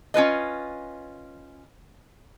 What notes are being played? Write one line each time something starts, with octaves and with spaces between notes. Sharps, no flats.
C#4 F4 B4 D#5